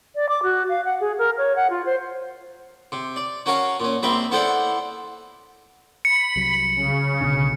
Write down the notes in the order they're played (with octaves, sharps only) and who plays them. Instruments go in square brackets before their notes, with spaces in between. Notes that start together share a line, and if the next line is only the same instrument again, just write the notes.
[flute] D5
D6
F#4
F5
F#5
G#4
A#4
C#5
F#5
F4
C5
[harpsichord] C3
D5
C#4 F#4 A#4 C#5 F5 A5
A#2 C#4
A#1 A#3 C4 E5 B5 C6
B3 E4 A4 C5 D5 F#5
[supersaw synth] B5 [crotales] C#7
[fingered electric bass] C2 F#3
[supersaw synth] C#3
[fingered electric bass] B1 B2 D3